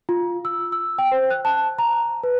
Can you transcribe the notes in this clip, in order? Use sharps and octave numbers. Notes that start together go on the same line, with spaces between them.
F4
E6
E6
G5
C5
F#6
A5
A#5
B4